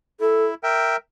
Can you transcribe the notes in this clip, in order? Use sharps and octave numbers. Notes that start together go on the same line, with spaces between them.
E4 A4
A#4 E5 G5